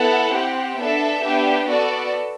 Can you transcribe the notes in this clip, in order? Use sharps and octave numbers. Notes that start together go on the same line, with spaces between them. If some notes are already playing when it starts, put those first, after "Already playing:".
Already playing: B3 E4 A4 F#5
C4 G4
B3 D4 A4 E5
B3 D4 G4
B3 F#4 A4 D5